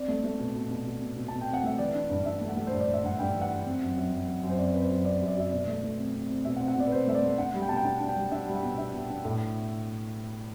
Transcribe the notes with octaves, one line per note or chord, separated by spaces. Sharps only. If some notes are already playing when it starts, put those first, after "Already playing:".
Already playing: C4 D5
A3
A3
B2
B2
B2
B2
B2
B2
B2 A5
G5
C4
F#5
A3 E5
E3 D5
D4
G2
D4 E5
A3
F#5
A3
G2 C5
D5
G2
E5
G2 F#5
G2 G5
E3
F#5
D4
C4
F#2
F#2
F#2
F#2
F#2
C5
C4 D5
C4 B4
C5
F#2
C4 D5
F#2
D5
F#3 E5
B2 D5
A3
A3
C4
C4
C4
B2 E5
F#5
C4
F#5
B2 D5
B4
B2 C5
A3 E5
D5
A3
D4 F#5
G3
G5
B2 A5
G5
D4 A5
D4
G5
G3
D4 E5
G3
F#5
B2
D4 E5
B2
D4
A2